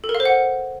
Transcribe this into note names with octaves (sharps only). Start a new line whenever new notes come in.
A4
A#4
F5
C5
F#5